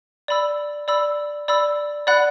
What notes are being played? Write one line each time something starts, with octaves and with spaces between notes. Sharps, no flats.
D5 B5 E6
D5 B5 E6
D5 B5 E6
D5 F#5 B5 F#6